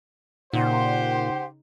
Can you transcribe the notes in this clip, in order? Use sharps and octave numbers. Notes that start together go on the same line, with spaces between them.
A#2 C#3 D#4 G4 C5 F#5 C6